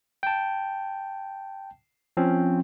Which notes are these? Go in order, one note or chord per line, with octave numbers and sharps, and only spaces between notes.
G5 A5
F3 C4 C#4